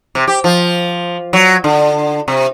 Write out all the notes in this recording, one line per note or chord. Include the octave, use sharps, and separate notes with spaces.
C3
G4
F3
F#3
D3
C3